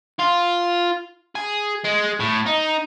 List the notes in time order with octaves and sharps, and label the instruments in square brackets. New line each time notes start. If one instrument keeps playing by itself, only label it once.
[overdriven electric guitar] F4
G#4
G#3
A2
D#4